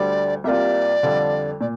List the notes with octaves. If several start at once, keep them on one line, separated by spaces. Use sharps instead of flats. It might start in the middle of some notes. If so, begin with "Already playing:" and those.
Already playing: D2 D3 G3 D5
C2 C3 A#3 F4 D5 E5
F2 D3 G3 D4 F4
A#2 D5